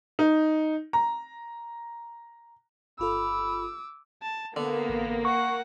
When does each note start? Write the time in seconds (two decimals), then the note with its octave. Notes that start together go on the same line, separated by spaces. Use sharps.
0.19 D#4
0.93 A#5
2.99 G1 F4 A4 B5 D6 E6
4.22 A5
4.56 D3 A#3 B3
4.89 A1
5.25 F#5 C#6